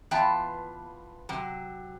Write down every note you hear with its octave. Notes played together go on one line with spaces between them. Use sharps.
E3 B3 F4 G5 A5
C3 F#3